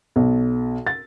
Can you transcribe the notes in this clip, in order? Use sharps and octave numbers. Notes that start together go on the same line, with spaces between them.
B1
A6